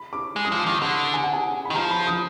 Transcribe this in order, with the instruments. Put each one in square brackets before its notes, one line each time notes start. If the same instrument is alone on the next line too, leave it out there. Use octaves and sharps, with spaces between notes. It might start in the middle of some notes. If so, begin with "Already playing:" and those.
Already playing: [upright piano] B5
D6
[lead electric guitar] G#3
[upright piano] D#6
[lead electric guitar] F3 [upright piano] D6
[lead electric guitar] D#3 [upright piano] D6
[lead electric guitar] D3 [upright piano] D#6
[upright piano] G#5
F#5
G#5
B5
[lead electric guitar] D#3
[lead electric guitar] F3 [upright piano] A#5
[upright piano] B5
D#6